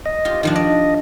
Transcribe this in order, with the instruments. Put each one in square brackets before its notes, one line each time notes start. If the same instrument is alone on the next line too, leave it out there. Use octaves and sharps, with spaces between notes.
[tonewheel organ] D#5
[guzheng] F4 G4
D#3 F3 D4
[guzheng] D5 [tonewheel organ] D#5